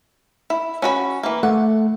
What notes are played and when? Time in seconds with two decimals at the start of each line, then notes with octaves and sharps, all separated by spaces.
0.50 E4
0.82 C#4 F#4 B5
1.23 E3 A#3
1.43 A3 F#5